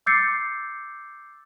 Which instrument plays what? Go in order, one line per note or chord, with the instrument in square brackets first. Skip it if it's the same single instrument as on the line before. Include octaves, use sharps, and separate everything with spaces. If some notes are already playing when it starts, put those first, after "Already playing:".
[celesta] D6 E6 G6 A6 C7 C#7